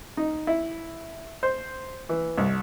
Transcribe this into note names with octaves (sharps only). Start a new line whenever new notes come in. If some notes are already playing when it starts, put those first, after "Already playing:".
D#4
E4
C5
E3
C2